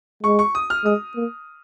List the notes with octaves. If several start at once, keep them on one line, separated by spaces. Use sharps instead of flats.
G#3 C#6
C#6
D#6
F6
G#3 D#6
A#3